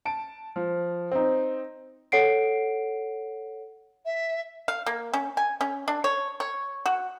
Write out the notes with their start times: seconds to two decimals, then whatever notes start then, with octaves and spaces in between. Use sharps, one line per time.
0.05 A5 D7
0.56 F3
1.11 C4 D#4
2.12 A4 C#5 F#5 C7 D7
4.06 E5
4.68 F5
4.86 A#3
5.14 C#4
5.37 G#5
5.61 C#4
5.88 D4
6.04 C#5
6.40 C#5
6.86 F#4